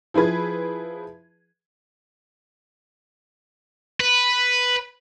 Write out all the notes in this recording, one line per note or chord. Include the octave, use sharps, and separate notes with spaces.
F3 E4 G#4 B4 G#6
B4